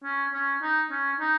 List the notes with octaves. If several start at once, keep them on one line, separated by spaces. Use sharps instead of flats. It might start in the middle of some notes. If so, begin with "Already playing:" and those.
C#4
C#4
D#4
C#4
D#4